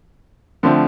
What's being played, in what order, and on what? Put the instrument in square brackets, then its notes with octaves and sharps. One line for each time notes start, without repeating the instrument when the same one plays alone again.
[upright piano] D3 F3 A3 C4